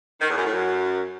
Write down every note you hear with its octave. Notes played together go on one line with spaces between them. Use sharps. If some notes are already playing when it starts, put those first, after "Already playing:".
D#3
E2
F#2
A2
F#2